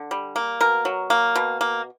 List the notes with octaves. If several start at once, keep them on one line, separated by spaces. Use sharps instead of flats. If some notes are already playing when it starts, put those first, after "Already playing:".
Already playing: D3
G3
A#3
B2 A#4
F#3
A#3
B2
A#3